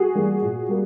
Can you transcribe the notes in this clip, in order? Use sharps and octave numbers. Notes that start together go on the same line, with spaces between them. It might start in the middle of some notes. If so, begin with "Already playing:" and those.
Already playing: F#4 G#4
E3 G3 A#3
A#2
G3 A#3